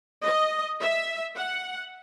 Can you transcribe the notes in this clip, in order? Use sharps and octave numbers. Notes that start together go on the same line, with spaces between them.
D#5
E5
F#5